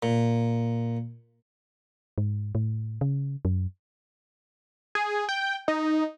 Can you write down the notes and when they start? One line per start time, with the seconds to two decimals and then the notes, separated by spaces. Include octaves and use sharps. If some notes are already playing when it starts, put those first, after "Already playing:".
0.03 A#2
2.18 G#2
2.55 A2
3.01 C#3
3.45 F#2
4.95 G#4
5.29 G5
5.68 D#4